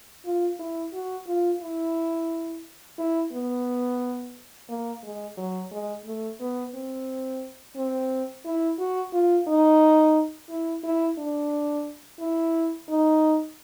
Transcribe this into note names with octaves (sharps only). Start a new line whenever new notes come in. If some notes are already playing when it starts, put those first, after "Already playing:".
F4
E4
F#4
F4
E4
E4
B3
A#3
G#3
F#3
G#3
A3
B3
C4
C4
E4
F#4
F4
D#4
E4
E4
D4
E4
D#4